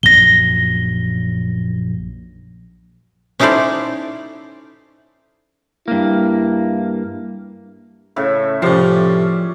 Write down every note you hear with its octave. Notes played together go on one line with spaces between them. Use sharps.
A#1 F#2 A#6 G7
C#4 D#4 E4 A4 C5 D5
G2 A#3 E4
A2 C#3 E5
A2 C3 F3 C#4 D5